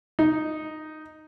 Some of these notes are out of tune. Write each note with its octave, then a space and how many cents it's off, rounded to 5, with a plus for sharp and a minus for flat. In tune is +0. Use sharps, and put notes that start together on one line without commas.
D#4 -5